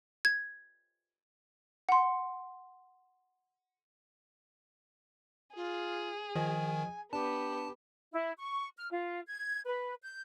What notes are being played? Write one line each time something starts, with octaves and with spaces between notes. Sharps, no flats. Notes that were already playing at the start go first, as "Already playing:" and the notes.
G#6
F#5 C6
F4 G#4
D#3 F3 D#5 G#5
B3 D4 G4 A5
E4
C#6
F6
F4
G#6
B4
G6